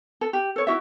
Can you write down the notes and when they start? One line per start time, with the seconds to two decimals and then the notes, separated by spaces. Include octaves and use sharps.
0.21 A4
0.33 G4
0.56 A4 C#5
0.67 E4 F#4 E5